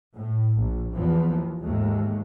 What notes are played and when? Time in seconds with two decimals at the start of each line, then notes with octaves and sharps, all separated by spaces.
0.14 A2
0.57 A#1
0.93 E2 E3 F3
1.31 D#2
1.61 D#2 G#2 G#3 A3